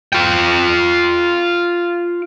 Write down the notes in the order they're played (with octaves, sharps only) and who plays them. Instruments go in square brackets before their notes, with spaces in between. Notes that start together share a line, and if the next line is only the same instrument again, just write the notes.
[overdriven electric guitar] F4 G5